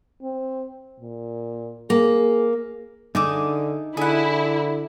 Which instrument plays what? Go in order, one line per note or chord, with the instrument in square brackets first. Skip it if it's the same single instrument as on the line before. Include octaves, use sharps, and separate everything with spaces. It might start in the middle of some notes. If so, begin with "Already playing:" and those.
[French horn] C4
A#2
[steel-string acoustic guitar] A#3 [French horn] G#4
[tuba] D3 [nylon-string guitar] D#4 [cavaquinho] G#4 E5 D6
[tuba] D3 [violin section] E4 [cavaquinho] G#4 F#5